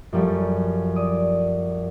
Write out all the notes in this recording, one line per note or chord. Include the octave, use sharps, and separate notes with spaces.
F#2 F3 G3 A3
D5 D#6